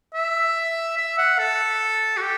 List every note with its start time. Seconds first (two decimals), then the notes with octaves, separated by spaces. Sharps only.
0.14 E5
0.97 E5
1.18 F#5
1.39 A4
2.17 F#4
2.22 G4